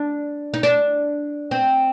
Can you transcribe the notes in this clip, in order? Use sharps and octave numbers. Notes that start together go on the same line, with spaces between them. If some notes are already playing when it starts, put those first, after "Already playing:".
Already playing: D4
D#4
D4
C4